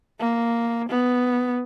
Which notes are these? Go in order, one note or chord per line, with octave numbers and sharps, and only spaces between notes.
A#3
B3